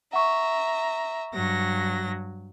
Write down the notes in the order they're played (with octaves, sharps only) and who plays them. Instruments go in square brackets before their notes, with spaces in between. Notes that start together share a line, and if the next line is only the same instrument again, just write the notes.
[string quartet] E5 A#5 [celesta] F#5 C#6
[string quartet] G2 F#3 A#6